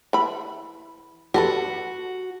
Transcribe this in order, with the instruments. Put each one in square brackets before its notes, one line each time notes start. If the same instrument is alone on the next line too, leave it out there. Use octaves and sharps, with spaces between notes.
[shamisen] E3 B5
[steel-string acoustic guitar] F#4 [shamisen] G4 A4 B4